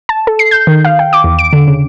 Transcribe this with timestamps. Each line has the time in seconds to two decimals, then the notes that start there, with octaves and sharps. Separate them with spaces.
0.09 A5
0.27 A4
0.39 C7
0.51 G6
0.67 D#3
0.85 F5
0.99 G5
1.13 D6
1.24 E2
1.39 D7
1.53 D3
1.67 C#3